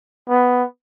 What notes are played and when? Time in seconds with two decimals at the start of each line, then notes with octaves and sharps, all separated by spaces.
0.29 B3